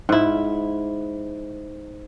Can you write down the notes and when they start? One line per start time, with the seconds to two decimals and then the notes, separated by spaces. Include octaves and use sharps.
0.09 G#2 E4